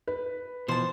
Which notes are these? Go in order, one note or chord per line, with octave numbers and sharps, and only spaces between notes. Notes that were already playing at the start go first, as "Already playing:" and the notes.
B4
B2 E3 F3 C5 A5